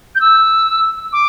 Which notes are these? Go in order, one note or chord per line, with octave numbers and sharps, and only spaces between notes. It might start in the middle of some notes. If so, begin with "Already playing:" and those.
G6
E6
D6